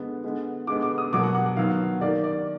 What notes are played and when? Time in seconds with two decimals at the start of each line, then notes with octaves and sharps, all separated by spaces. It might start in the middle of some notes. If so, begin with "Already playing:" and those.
Already playing: D3 G#3 B3
0.24 D3 G#3 B3
0.67 D3 G#3 B3 D6
0.82 D6
0.98 D#6
1.12 B2 F#3 A#3 D6
1.23 F#5
1.35 F#5
1.46 F#5
1.57 D#3 F#3 B3 F5
2.01 D#3 A#3 D5
2.24 D5